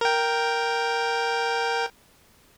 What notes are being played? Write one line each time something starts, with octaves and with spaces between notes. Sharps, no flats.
A#4 G5